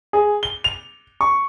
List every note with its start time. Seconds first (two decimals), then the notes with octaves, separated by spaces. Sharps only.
0.13 G#4
0.43 G7
0.64 F7
1.21 C#6